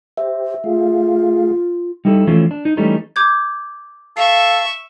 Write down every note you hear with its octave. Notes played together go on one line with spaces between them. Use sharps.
G4 C5 E5
A3 F4 G#4 F5
G3 D#4 E4 A4
E3 F3 A3 C#4
D4
D#4
E3 G3 A3 C#4 D#4
D6 G6 G#6
A4 E5 F5 C#6 C7